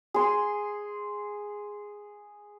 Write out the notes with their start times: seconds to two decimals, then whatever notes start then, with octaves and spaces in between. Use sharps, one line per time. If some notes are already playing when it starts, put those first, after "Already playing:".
0.14 G#4 C6